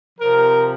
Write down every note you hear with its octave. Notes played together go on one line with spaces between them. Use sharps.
C3 F3 A#4